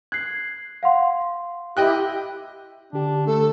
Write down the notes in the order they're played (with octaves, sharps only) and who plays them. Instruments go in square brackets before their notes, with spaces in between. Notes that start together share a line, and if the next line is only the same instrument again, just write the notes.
[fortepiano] F#6 [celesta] G#6 C7
[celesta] F5 F#5 C6
[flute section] E4 G4 [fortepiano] D#5 G5 F#6
[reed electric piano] D3 G4 [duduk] D4
[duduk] A3 [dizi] A4